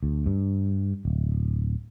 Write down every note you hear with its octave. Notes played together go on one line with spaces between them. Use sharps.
D2
G2
D1